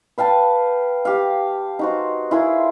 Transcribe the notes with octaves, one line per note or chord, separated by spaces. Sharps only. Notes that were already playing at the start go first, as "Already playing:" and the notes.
B4 F5 G5 A5
G4 F5
D#4 F#4 C5
E4 F4 G#4 A#4